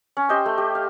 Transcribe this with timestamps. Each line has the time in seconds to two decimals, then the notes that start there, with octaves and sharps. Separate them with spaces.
0.17 C#4
0.29 G4 C5 D#5 G5
0.46 A3
0.58 G4
0.75 F5